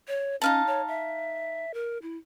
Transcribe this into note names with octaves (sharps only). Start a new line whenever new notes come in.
C#5
C#4 D#4 F5 A5
C#5
E5
A#4
E4